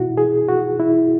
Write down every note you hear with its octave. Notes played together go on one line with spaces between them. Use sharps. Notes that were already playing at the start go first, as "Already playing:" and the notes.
Already playing: B2 E4 F#4
G#4
F#4
E4